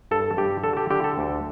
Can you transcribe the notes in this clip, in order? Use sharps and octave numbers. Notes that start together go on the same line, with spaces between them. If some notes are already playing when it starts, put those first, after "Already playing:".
G2 A4
G2 G4
D3 A4
G4
D3 G4
A4
D2